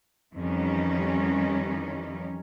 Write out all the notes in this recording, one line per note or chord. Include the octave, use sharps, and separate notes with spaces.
F2 D#3 E3 G3 C#4